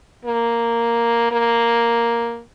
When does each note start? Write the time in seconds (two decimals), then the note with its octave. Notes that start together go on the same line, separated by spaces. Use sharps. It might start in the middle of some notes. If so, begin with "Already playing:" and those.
0.25 A#3
1.32 A#3